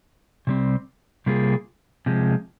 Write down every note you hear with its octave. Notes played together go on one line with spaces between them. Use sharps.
C3 G3 C4
C3 G3 A#3 F4 G#4
C3 F3 G#3